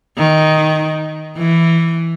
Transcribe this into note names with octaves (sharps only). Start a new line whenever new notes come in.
D#3
E3